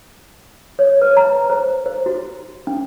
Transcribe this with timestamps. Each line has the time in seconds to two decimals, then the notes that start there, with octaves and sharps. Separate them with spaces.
0.79 C#5
1.01 B4
1.17 A#5
1.50 C5
1.86 C5
2.06 F#4
2.67 C#4